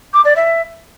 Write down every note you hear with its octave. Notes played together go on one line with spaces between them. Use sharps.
D6
D5
E5